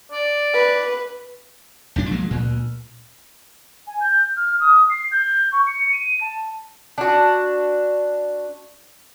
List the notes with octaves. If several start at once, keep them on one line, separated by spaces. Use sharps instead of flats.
D5
B4
B1 G2 D4
F3 F#3 G#3 A#3
D2 A#2
G#5
G6
F6
D#6
C7
G6
C#6
C#7
D#7
A5
D4 F#4